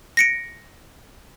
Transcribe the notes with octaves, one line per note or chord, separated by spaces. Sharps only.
A#6 C#7 D7